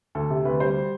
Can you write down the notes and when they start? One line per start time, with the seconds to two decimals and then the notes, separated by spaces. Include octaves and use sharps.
0.15 D2 A4
0.30 C3
0.45 D2 B4
0.60 G3 C5